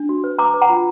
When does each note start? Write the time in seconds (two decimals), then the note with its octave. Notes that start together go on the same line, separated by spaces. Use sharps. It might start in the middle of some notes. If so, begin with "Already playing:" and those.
Already playing: D4
0.09 F#4
0.24 B4
0.39 B4 A#5 D6
0.54 B4
0.62 F#5 A#5
0.69 F4